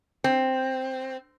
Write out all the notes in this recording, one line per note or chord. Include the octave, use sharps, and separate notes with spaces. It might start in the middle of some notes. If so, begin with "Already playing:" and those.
C4